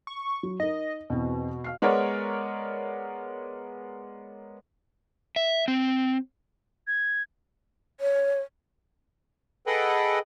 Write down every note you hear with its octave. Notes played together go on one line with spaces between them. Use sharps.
C#6
F#3
D#4 A#4 D#5
E2 B2 E3 C4
F5 F6 C7
G#3 B3 A#4 C#5 D5
E5
C4
G#6
C#5
G#4 A4 B4 D#5 F#5 G5